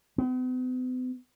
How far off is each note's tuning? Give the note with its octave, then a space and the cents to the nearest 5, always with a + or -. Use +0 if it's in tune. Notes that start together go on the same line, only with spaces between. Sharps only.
B3 +45